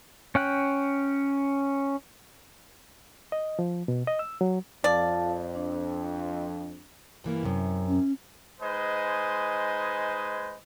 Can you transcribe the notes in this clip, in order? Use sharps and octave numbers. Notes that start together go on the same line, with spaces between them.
C#4 G5 F#6
D#5
F3
B2
D#5
E6
F#3
F2 F4 D5 F5 A5
D4
G2 E3 A#3
F#2 C3
C#4
G#3 D#4 B4 C5 D#5 G#5